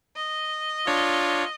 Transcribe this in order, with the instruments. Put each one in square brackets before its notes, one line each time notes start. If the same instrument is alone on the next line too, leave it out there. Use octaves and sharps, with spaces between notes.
[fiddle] D#5
[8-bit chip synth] D4 C#5 [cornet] F4